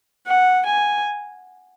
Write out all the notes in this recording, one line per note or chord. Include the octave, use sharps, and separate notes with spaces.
F#5
G#5